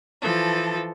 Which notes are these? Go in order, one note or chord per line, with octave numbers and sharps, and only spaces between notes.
E3 F3 A4